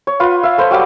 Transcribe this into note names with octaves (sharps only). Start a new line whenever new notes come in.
C#5
F4 B4 F#5
E5 F5
A4 B4 C5
F#3 G3 F5 D6